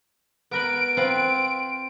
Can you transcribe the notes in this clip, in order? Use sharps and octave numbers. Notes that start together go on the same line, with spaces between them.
B3 A#4 B4 D7
C4 F4 B4